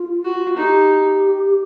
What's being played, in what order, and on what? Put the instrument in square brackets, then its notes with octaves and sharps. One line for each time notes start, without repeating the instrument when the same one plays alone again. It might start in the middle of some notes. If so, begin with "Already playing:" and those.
Already playing: [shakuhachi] F4
[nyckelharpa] F#4
[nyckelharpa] D#4 [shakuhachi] G4